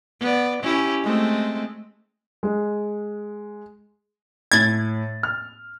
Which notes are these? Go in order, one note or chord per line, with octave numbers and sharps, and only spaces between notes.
B3 D5
C#4 E4 G4
G#3 A3 C4
G#3
A2 G#6 A6
F6